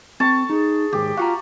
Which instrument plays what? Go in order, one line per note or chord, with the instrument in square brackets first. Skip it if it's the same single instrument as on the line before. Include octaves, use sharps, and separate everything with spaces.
[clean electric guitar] C4 [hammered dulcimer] A5 C#6
[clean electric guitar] D#4 [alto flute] G#4
[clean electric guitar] D#2 G#2 [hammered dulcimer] G4
[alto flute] F4 [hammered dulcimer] F#4 [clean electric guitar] F5 F#5 A#5